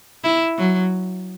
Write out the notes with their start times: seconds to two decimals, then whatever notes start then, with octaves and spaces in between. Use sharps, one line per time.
0.24 E4
0.58 F#3